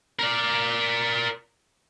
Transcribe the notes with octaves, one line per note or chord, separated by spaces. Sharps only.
A#4 D5